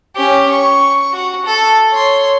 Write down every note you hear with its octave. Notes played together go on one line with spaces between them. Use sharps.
C#4 G4
C#6
F#4
A4
C#5 C6